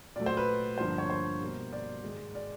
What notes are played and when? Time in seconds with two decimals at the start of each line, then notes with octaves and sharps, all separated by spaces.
0.16 A#2 F#3 A3 D5
0.26 C5
0.37 B4
0.78 G2 D3 F3 A#3 C5
0.98 C#5
1.10 C5
1.41 B2 G3 A#3
1.73 D5
2.03 G#2 D#3 G#3
2.35 D5